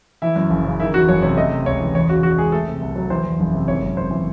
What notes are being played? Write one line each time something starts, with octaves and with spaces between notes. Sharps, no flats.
E3 E4
F#2
F#1
C#3
D#3 E4
E2 F#4
F#1 C#5
C3 C#5
A3 D#5
C3
C#2 C#5
E3
E2 C#5
C#3 F#4
E2 F#4
G#3 G#4
A3 A4
C3
C2
F#3
E3 C5
E2
F#1
C3
G#1 C#5
F#2
G#1 C5
E3